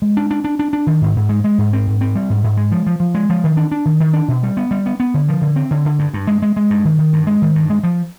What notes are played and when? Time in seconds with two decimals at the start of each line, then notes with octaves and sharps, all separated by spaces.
0.02 G#3
0.17 D4
0.31 D4
0.44 D4
0.59 D4
0.73 D4
0.87 D#3
1.01 G#2
1.16 G#2
1.29 G#3
1.44 G#3
1.58 G#2
1.73 C4
1.87 G#2
2.01 C4
2.16 G3
2.30 G#2
2.44 G#2
2.57 G#3
2.72 F3
2.87 F3
3.00 F3
3.14 G#3
3.30 F3
3.44 D#3
3.57 D4
3.71 D4
3.85 D#3
4.00 D#3
4.14 D4
4.28 B2
4.43 G3
4.57 B3
4.71 G3
4.86 B3
5.00 B3
5.14 D3
5.29 F3
5.42 D3
5.56 C4
5.71 D3
5.85 D3
5.99 G2
6.14 G2
6.27 G#3
6.42 G#3
6.57 G#3
6.70 G2
6.85 D#3
6.99 D#3
7.13 G2
7.27 G#3
7.42 D#3
7.55 G2
7.70 G#3
7.83 F3